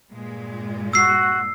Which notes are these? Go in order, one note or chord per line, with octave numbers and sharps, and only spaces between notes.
G2 A#2 G#3
F#4 E6 C7